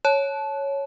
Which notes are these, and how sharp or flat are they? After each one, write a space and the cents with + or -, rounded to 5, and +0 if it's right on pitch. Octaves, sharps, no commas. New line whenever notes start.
C#5 +0 A5 -20